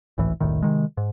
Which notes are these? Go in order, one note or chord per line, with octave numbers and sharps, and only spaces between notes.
G#1 C#2 A2 E3
E1 C2 A2 D#3
C3 D#3 G#3
G#2